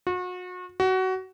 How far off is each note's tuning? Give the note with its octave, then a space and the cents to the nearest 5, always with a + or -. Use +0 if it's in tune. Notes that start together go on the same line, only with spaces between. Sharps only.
F#4 -35
F#4 +20